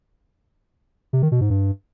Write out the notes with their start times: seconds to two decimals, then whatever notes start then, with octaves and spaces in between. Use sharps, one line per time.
1.13 C3
1.22 D#3
1.32 B2
1.41 G#2
1.50 G2